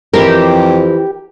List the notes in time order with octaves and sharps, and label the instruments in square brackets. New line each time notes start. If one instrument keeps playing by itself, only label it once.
[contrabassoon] F2 [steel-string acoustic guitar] E3 C4 E4 [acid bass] G4 [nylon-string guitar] A#4